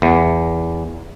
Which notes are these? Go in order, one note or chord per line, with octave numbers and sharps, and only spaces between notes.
E2